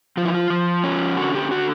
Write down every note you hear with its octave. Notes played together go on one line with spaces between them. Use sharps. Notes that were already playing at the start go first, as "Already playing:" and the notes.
F3 F4
E4
F4
F3
C#4
D3 F#4
G4
D3 F#4